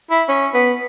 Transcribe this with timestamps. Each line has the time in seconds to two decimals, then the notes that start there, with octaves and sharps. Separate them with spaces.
0.10 E4
0.28 C#4
0.54 B3